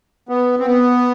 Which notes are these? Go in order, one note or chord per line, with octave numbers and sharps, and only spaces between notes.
B3
C4
B3